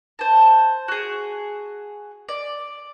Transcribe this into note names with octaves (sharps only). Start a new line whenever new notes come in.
C5 A5
F#4 G#4
D5